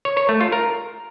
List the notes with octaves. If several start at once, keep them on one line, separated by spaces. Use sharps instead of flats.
C#5
C#5
A3
F4
A#4